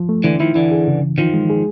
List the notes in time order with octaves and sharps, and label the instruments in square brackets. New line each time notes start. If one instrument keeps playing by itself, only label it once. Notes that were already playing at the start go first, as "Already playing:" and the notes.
Already playing: [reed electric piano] F3
A3
[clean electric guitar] D3 E3 [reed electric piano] E4
[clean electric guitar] D#3 F3 [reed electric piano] E4
[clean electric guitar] D3 E3 [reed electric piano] E4
[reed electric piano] G#4
C#3
E3
[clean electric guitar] D#3 F3 [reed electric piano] F4
[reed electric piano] G#3
G#4